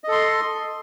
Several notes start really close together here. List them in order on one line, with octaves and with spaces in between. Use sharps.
D#5 A4 C6